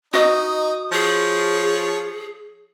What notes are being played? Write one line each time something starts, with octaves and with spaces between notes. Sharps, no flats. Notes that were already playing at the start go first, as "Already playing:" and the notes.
D#4 F#4 D#5 D#6
F3 G#4 C#5